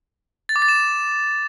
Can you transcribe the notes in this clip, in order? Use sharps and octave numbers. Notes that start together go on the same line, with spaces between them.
A6
D6
A6
E7